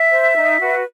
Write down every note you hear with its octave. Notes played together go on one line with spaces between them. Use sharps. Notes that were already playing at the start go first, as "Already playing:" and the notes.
Already playing: E5
C5
D#4
F#4 B4